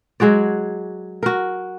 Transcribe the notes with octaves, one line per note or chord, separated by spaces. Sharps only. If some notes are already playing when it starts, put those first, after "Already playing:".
F#3 G#3 F#4 D5
F#4 A#4